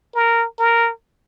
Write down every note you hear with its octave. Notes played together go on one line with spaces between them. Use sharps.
A#4
A#4